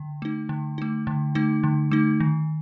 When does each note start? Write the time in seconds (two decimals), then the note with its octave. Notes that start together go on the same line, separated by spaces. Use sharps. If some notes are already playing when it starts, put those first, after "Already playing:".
Already playing: D3
0.22 A3 D#4
0.49 D3
0.78 A3 D#4
1.07 D3
1.35 A3 D#4
1.63 D3
1.91 A3 D#4
2.20 D#3